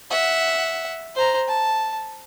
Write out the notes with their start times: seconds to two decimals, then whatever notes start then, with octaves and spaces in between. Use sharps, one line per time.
0.11 E5 F#5
1.15 C5 A#5
1.48 A5